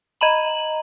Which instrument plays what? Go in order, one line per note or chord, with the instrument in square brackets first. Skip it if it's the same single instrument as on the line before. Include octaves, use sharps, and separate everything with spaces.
[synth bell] D#5 A#5 B5 F#7